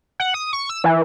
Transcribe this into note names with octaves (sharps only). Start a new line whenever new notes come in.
F#5
D#6
C#6
E6
E3